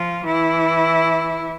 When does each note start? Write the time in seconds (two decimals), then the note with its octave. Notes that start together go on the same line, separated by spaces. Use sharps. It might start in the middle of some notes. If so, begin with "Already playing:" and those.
Already playing: F3 F4
0.24 E3 E4